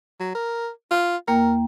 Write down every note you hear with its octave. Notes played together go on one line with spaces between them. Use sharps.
F#3
A#4
F4
E2 A#3 A#4 G5